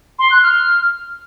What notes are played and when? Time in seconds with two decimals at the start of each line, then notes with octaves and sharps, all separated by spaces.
0.18 C6
0.30 F#6
0.42 F6